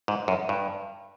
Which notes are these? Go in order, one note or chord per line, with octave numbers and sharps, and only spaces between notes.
G#2
F#2
G2